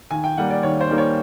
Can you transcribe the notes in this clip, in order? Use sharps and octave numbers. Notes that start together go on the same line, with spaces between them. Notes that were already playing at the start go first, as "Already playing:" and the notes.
D#2 G#5
G5
D#3 G3 A#3 F#5
D5
D#2 C#5
C5
D#3 G3 A#3
C#5